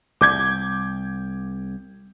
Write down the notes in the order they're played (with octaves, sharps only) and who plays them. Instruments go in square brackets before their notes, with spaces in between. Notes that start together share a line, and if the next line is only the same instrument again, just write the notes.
[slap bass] C2 [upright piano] D6 G6 G#6